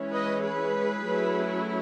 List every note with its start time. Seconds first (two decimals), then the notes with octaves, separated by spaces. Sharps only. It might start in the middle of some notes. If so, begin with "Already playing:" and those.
Already playing: E3 G#3 C#4 E4
0.12 B4 D#5
0.43 G#4 B4
1.02 F#3 A3 C#4 E4